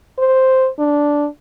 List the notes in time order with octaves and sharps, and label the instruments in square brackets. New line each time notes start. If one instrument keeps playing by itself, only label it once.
[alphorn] C5
D4